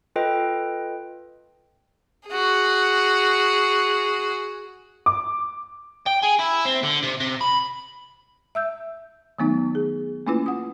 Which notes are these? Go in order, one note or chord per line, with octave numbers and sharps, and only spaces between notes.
F4 A4 B4 D#5 G5
F#4 G#4
D6
G5
G#4
E4
C4
D3
C3
C3
B5
E5 E6 G6
D#3 F#3 A3 B3 D#4
G#4
A3 A#3 C#4 E4 F4 B4
F#5 D#6